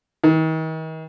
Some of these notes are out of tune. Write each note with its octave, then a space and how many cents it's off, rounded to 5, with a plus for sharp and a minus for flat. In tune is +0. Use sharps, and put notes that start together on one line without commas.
D#3 +40